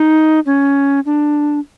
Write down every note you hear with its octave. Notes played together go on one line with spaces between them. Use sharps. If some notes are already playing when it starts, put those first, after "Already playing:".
Already playing: D#4
C#4
D4